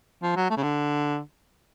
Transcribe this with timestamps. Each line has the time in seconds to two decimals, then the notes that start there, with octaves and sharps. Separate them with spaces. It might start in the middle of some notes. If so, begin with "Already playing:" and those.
0.23 F3
0.36 F#3
0.50 A3
0.57 C#3
0.63 D3